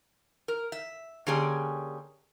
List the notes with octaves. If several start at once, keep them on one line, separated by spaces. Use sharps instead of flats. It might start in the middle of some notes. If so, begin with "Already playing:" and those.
A#4
E5
D3 A#3 C#4 G4 G#4